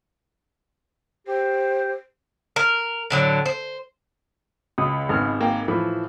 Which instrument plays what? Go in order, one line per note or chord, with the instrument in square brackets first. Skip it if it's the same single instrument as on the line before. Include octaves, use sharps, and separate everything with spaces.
[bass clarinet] G4 [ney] C5
[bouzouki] A#4
A2 D3 F#3
C5
[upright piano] C#2 [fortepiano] D#6
[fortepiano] G#1 B3 F6
[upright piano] A#3 F5 G5
[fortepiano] A2 E3 F3 [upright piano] B5